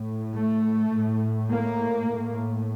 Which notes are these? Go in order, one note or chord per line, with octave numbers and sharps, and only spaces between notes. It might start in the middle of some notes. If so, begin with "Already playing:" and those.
Already playing: A2
A3
A2
A#3
A2